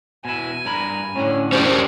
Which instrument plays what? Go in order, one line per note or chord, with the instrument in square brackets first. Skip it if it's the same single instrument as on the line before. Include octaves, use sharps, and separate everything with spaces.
[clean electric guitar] B2 E4 [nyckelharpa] G#5
[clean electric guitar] G2 A#4 B5
[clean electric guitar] A2 D3 [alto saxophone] C#4
[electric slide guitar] C#4 G4 D5 [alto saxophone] C5